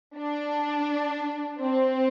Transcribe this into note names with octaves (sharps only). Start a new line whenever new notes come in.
D4
C4